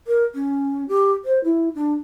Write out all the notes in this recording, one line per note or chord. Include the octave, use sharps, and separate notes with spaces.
A#4
C#4
G4
C5
E4
D4